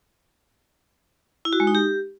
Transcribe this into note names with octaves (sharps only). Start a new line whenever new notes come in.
E4
F#4
G#3
D#4
G4